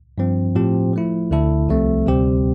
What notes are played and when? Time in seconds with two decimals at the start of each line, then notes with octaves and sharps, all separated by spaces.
0.18 G2 F3 C4
0.55 A2 F3 C4 G4
0.93 F3 A3 E4
1.31 D2 D3 A3 E4 A4
1.69 C2 C3 F3 A3 C4
2.06 D2 C3 G3 C4 G4